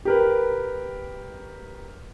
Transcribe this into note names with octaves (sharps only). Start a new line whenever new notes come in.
G4 A#4 B4